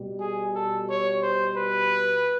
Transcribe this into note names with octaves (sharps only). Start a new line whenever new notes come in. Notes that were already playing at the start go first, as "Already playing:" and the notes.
Already playing: B2 G3
G#4
A4
C#5
C5
B4